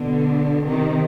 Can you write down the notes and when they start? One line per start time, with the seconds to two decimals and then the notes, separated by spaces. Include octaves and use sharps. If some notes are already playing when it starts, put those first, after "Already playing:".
Already playing: B2 D3
0.64 C3 D#3